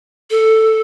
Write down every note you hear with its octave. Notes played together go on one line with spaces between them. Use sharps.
A4